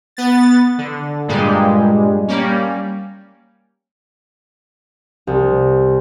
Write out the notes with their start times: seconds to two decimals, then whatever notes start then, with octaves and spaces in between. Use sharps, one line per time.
0.17 B3 A6
0.78 D3
1.28 G2 A#2 G3 G#3
2.28 G3 A#3 C#4
5.27 C2